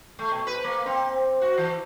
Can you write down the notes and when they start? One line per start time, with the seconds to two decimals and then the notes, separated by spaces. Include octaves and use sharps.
0.19 A3
0.31 B2
0.47 B4
0.64 A#3
0.86 C4
1.42 F#4
1.58 E3